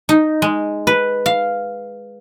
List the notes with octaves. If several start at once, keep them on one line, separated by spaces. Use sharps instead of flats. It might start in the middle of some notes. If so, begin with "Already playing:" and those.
D#4
G#3
B4
F5